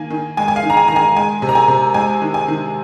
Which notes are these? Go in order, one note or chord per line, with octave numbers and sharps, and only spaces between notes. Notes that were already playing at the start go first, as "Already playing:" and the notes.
Already playing: D#3 A#3 G#5
D#3
G#3 G#5
G#5
F5
D#3
A#5
G#5
D#3 A#5
G#5
G#3 G#5
C3
A#5
G#5
C3
G#3 G#5
D#3
G#5
D#3